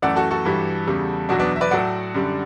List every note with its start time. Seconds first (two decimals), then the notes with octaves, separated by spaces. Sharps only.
0.02 F#2 E3 A3 D5 F#5
0.16 F#4 A4
0.31 F#4 A4
0.45 G2 E3 G3
0.87 E2 C#3 G3
1.29 E2 B2 F#3 D4 F#4
1.40 B3 D4
1.56 E5
1.61 B4 D5
1.71 A2 F#3 A3 D5 F#5
2.14 F#2 D3 G3